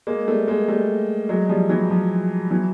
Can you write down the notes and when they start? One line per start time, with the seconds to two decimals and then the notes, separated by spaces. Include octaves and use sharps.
0.07 G#3 A#3
0.28 G3 A3
0.48 G#3 A#3
0.68 G3 A3
1.29 F#3 G#3
1.49 F3 G3
1.69 E3 F#3
1.90 F3
2.50 E3 F#3